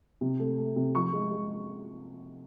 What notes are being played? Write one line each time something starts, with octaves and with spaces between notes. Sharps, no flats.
C3
A3
A3
C3
F3 C#6
G#3
G#3